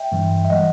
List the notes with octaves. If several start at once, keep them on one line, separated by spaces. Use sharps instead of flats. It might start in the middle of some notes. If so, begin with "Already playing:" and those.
Already playing: E5 G5
G2 E3 G3
E5
E3 G3 D#5 F#5